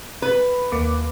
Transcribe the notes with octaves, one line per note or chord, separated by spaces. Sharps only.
B4
D#2 A#3 D6